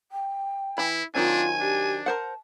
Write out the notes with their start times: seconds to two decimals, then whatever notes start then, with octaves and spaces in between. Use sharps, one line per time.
0.11 G5
0.78 E3 E4 B5
1.15 D#3 F#3 C4 D4 F4 G#5
1.60 D4 G4
2.06 A#4 C5 F#5 A5